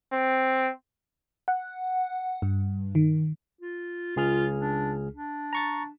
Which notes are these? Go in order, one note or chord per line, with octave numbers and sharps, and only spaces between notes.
C4
F#5
G2
D#3
F4
C#2 F4 G#4 F6
D4
D4
A#5 C#6 A6